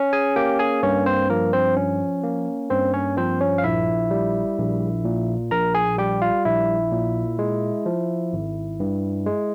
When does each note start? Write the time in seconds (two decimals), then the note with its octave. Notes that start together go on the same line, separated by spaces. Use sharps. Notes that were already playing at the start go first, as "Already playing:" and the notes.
Already playing: C#4
0.13 G#4 G#5
0.36 A#3 G4 G5
0.59 G#4 G#5
0.83 G2 C#4 C#5
1.06 C4 C5
1.30 F3 A#3 A#4
1.53 C4 C5
1.77 C#4
2.23 A#3
2.70 G2 C4 C5
2.94 C#4 C#5
3.17 F3 C4 C5
3.41 C#4 C#5
3.58 F5
3.64 A#1 E4 E5
4.11 G3
4.58 A#1
5.05 A#2
5.51 A#1 A#4 A#5
5.75 G#4 G#5
5.98 G3 G4 G5
6.22 F4 F5
6.45 A#1 E4 E5
6.92 A#2
7.39 G#3
7.86 F3
8.33 G#1
8.80 G2
9.26 G#3